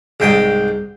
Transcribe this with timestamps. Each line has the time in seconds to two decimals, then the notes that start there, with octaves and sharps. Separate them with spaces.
0.20 C2 G#2 G5 D#6